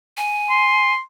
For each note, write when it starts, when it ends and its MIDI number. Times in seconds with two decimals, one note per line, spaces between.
0.17 0.92 80
0.50 1.00 84